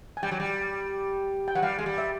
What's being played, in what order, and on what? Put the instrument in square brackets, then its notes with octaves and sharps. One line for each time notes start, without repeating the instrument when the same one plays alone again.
[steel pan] G#5
[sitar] G3 [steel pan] G5
[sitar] F#3
G3
[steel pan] G5
[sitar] F#3 [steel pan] F#5
[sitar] G3 [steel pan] F5
[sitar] G#3
G3
[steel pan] E5